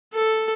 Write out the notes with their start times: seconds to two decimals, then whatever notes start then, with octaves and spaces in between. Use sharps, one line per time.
0.14 A4